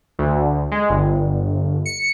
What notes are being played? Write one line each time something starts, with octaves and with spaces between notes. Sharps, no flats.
D2
G#3
G1
C#7